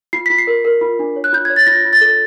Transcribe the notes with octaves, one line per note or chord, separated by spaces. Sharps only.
F4 C7
F4 B6
C7
A#4
A#4
F4
D4
C#5
F#6
F4 G6
C#5 G#6
A6
F4 A#6
F4
A6
A4